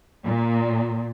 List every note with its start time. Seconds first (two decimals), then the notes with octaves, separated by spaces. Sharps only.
0.24 A#2